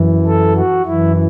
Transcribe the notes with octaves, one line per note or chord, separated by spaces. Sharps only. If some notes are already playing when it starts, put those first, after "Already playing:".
Already playing: F#2 E3
A4
F#4
F#2 E3 E4